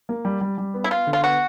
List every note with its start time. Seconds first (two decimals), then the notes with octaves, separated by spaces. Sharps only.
0.09 A#3
0.25 G3
0.41 G3
0.58 G3
0.74 B3
0.84 E4
0.91 B3 F4
1.07 D3
1.13 F4
1.24 B3 F#4